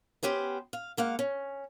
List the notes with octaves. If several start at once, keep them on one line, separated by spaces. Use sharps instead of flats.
B3 C#4 G4 C5
F5
G#3 A#3 F5 F#5
C#4